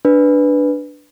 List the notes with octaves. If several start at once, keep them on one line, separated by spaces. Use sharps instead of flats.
D4 B4